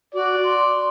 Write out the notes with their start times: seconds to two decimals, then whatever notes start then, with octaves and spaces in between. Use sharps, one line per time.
0.15 F#4 D5
0.44 C6